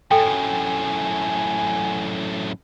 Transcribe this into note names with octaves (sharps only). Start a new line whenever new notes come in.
F#2 A2 A4 G5 G#5